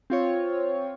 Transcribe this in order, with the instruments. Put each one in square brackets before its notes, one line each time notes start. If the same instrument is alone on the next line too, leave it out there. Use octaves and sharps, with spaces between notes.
[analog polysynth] C4 F4 C#5